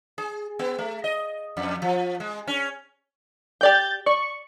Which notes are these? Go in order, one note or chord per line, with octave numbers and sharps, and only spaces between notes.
G#4
B3
A3
D#5
F2
F3
G#3
C#4
G4 D5 G5 G6 A6
D5 C#6